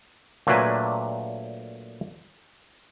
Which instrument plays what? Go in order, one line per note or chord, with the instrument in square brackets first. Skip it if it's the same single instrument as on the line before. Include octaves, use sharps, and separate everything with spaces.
[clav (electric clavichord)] A#2 F#3 A3 D4 B4 G#5